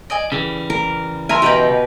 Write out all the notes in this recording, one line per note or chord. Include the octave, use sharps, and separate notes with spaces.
D5 D#5 G#5
C#3 E3 G3 G#4
A#4
A#4 E5 G#5 A#5 C6
B2 D#4 G4 B4 G5